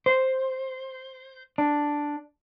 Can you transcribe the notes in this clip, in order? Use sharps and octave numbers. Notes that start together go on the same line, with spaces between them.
C5
D4